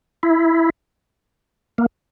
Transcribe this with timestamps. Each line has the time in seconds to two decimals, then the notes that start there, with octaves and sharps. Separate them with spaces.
0.23 E4
1.78 A#3